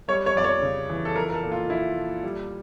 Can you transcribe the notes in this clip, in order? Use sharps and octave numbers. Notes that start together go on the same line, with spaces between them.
G3 C#5
C#5
F2 D5
C#5
C#3
E3
A4
F3 A#4
A#4
A4
A#2
F4
F3 E4
A#2
G3